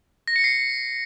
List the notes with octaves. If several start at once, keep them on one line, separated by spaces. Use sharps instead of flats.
A#6
C#7
C7